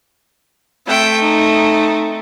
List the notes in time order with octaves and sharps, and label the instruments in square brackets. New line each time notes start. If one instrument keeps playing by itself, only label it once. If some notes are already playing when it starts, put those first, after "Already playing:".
[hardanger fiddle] A3 C4 [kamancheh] E5 G5
[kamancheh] D#4